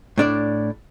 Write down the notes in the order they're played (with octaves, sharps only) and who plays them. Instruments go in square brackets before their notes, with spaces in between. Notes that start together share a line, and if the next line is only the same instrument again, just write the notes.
[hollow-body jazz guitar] A2 D4 D5